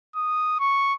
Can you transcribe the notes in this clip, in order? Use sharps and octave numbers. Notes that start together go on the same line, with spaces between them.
D#6
C#6